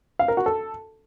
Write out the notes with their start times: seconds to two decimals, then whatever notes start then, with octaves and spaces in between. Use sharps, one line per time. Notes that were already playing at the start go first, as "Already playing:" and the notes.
0.19 F5
0.28 A#4
0.37 F#4
0.46 A4